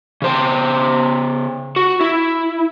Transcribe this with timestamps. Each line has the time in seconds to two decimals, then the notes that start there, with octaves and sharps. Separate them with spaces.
0.22 C#3 C5 G5
1.76 F#4
2.01 E4